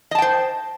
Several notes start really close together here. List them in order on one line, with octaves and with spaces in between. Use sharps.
D#5 A5 G5 C5